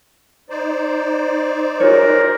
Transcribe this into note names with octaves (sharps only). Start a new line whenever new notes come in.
D#4 C5 D5
F#4 G#4 A#4 C#5